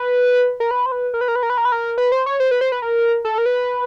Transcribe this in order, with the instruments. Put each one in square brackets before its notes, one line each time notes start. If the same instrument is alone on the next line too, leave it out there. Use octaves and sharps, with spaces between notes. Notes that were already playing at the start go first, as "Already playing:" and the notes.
Already playing: [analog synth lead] B4
A#4
B4
C5
B4
A#4
B4
A#4
B4
A#4
B4
A#4
B4
A#4
B4
C5
C#5
C5
B4
C5
B4
A#4
A4
A#4
B4